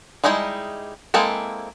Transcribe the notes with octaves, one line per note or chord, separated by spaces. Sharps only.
G3 G#3 D#4 E4 G#4
G#3 A#3 C4 E4 A4